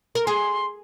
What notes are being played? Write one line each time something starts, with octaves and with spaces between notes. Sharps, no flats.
A#4
G#4 C6